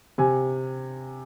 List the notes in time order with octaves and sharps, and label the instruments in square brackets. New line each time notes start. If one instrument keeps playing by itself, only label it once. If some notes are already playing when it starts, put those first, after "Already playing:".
[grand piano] C3 G#5